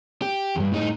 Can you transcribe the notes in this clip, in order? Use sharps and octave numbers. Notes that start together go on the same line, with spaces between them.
G4
E2 G2
A2 D#4